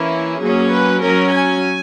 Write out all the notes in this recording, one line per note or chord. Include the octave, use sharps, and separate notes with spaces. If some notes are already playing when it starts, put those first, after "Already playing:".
Already playing: E3 A#3 C#4 E4
F#3 A#3 C#4 G#4
B4
F#3 C#4 A#4
G#5